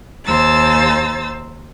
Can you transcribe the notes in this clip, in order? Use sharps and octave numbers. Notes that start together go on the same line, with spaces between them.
D#2 C5 A#5 E6 A6